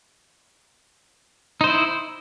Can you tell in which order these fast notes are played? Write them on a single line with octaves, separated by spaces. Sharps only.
D#4 C5 E4